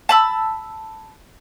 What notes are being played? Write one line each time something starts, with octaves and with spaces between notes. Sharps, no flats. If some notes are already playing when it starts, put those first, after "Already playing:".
A5 B5 E6